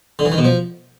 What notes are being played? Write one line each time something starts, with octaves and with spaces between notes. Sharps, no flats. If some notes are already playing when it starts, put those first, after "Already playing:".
D3
E3
D#3
B2
F3